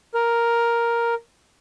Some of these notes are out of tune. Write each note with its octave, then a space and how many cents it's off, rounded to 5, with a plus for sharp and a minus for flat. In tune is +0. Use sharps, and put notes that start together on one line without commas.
A#4 +5